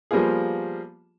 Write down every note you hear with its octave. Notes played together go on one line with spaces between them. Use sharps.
F3 G3 A#3 B3 F4 G#4